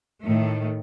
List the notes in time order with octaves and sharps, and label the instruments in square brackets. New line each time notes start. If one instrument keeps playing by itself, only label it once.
[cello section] A2 D#3 A3